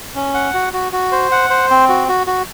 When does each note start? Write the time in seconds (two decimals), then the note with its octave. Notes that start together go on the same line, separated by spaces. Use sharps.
0.15 C#4
0.34 F#5
0.54 F#4
0.73 F#4
0.92 F#4
1.12 C5
1.32 F#5
1.50 C5
1.70 C4
1.89 F#4
2.08 F#4
2.27 F#4